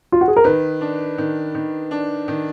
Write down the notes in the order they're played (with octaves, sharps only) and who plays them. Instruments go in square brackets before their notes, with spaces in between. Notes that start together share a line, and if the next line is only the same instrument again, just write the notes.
[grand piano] F4
F#4
G#4
A#4
[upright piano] D#3 [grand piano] B4
[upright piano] D4
D#3
D#3
D4
D#3